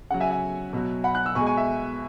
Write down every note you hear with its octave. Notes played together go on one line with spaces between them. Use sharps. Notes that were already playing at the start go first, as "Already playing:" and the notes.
C#3 F#3 F#5
E5 G#5
E5 G#5
B2 F#3
F#5 B5
F#6
E6
B2 G#5 C#6
G#3
G#5 C#6
E5